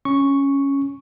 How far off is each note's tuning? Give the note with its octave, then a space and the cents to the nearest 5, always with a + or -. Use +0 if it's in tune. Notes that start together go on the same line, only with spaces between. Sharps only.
C#4 +0 C#6 +0